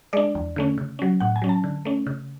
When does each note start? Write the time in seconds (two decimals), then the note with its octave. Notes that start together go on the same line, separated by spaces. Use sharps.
0.13 G#3 D4 D5
0.35 E2
0.56 D3 A3 C#4
0.78 C#3
0.99 F#3 C#4
1.20 A2 F#5
1.36 G#5
1.42 F#3 C#4
1.49 A5
1.64 D3
1.85 A3 C#4
2.07 C#3